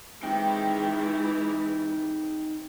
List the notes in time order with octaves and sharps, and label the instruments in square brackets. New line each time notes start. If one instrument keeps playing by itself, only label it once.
[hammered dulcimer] C3 [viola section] E3 G#3 E4 [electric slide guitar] D#4 G5